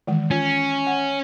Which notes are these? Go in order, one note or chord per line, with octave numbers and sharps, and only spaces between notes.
D#3 E3 G#3
C#4 F4
F#5